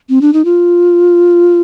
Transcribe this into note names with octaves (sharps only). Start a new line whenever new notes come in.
C4
D4
D#4
F4